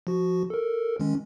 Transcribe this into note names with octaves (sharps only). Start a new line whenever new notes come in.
F3 F#4
A4 A#4
D#3 G#3 C#4